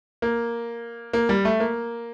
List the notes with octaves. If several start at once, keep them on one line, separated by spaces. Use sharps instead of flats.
A#3
A#3
G3
A3
A#3